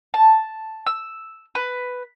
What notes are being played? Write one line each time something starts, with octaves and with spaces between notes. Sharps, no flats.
A5
E6
B4